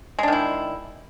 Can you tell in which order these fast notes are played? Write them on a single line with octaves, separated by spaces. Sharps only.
G#3 D4 D#3 E4